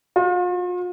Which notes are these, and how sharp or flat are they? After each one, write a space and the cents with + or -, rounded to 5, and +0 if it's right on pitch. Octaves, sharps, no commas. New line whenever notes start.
F4 +40